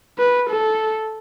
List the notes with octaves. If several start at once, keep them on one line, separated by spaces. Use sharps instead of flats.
B4
A4